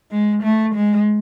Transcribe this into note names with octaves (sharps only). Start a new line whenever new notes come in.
G#3
A3
G#3